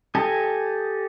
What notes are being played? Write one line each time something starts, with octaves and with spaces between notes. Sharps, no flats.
G4 A4 D#5 G#5